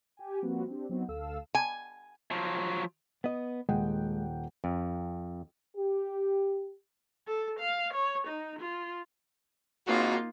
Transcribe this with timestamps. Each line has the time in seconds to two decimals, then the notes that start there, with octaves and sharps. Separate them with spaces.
0.17 G4 G#5
0.42 F3 G3 A#3 C4 F#4 B4
0.68 C4 D4 G4
0.89 F#3 B3 C4 D#4 F#4
1.08 D2 A4 F5 E6
1.55 G#5
2.31 F3 F#3
3.24 B3 D#5
3.69 D#1 G#3 F#5 G5
4.64 F2
5.77 G4
7.27 A4
7.60 F5
7.94 C#5
8.27 D#4
8.60 F4
9.87 G#1 A#3 D#4 F4 F#4